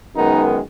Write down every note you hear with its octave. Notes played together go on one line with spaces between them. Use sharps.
F#2 D#3 G#3 B3 D#4